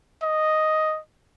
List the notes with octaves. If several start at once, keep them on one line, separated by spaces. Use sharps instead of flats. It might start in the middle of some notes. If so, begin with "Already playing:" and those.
D#5